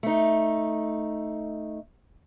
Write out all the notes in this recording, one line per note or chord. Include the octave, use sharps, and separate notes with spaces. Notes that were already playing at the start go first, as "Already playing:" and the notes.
A3 D#4